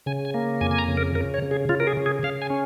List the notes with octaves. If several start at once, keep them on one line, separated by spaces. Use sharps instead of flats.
C#3 G#5
G#5
A#3
F2 G#5
G#5
A#5
C#3
A#4
C#3 A#4
C#5
C#3
G#4
C#3 F4
A#4
G#4
C#3
G#4
C#3 F5
G#5
C#4